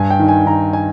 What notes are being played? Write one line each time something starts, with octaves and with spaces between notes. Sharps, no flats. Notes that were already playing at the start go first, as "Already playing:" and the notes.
Already playing: G2 G#5
G5
D#3
G#5
D#3 A#5
G#5